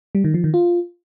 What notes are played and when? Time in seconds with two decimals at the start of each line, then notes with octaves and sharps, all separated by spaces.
0.15 G3
0.24 D#3
0.34 F3
0.44 D#3
0.54 F4